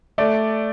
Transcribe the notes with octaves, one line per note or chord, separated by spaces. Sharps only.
A3 D5